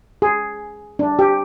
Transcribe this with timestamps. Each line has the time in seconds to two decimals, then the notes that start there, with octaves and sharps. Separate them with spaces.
0.22 G#4
0.99 D4
1.19 G4